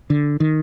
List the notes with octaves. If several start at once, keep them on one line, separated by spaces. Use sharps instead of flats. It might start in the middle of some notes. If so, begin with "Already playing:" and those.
D3
D#3